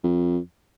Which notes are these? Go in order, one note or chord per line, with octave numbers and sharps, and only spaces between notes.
F2